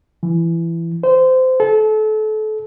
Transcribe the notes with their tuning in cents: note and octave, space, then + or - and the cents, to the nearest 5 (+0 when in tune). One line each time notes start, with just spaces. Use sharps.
E3 +20
C5 -20
A4 -30